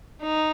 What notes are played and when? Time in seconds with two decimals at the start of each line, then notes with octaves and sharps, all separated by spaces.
0.21 D#4